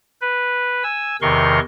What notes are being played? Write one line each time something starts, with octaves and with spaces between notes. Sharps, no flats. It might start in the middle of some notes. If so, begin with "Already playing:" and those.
B4
G#5 E6
E2 C3 D#3 A#4 C6 C#6